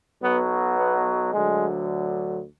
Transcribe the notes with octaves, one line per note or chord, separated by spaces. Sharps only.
B1 B2 F#3 B3
B3
D2 D3 F#3 G#3